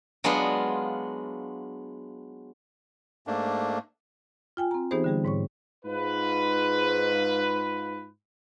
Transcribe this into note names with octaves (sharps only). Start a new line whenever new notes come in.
F#3 G#3 B3 D4 F4
G#2 A3 A#3 D4
F4 G5 G#5
C4 A#5
E3 B3 D#4 G4 G#4 C5
D3 G3 G#4
G#2 C#5 C#6
G#2 F4 B4